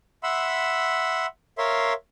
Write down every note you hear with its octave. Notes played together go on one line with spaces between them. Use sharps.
E5 F#5 B5 C6 E6
A#4 C#5 E5 F5 C6